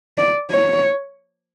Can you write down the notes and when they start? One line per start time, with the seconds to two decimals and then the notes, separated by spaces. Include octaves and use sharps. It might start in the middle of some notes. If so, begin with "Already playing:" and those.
0.18 D5
0.51 C#5